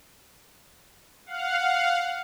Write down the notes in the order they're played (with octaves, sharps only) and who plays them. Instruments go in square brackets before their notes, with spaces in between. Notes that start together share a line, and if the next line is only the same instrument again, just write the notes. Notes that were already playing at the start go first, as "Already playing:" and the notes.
[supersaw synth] F5 F#5